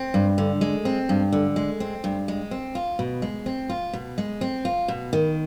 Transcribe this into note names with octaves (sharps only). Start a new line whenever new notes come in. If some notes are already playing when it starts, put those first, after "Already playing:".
Already playing: C4
G2
D3
G#3
C4
G2
D3
G#3
C4
G2
G#3
C4
F4
B2
G#3
C4
F4
B2
G#3
C4
F4
B2
D#3